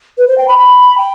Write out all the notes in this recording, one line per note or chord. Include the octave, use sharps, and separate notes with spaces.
B4
C5
G5
B5
B5
G5